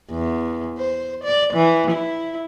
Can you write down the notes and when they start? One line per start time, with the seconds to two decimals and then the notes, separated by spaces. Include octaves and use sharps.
0.11 E2
0.78 C5
1.24 D5
1.53 E3
1.91 E4